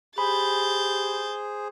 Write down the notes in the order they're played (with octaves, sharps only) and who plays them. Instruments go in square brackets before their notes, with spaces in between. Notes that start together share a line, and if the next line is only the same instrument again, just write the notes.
[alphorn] G4 [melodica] G#4 C5 [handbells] B5 [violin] G6 A6